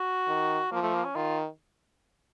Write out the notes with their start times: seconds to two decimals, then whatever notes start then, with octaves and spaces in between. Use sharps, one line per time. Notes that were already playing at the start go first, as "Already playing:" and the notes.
Already playing: F#4
0.28 D#3
0.72 F3 A#3
0.82 A3
0.94 A#3
1.04 C#4
1.15 D#3 F4